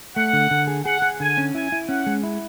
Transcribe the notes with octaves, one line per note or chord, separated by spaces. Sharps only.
A3 F#5
D3
D3
G#4
G#4 F#5
G#4
D3 G#5
C#4
E4 G#5
E4
C#4 F#5
G#3
E4